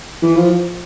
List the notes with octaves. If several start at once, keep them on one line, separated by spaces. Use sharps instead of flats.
E3
F3